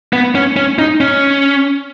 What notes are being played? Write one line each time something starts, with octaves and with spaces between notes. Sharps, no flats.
B3
C#4
C#4
D#4
C#4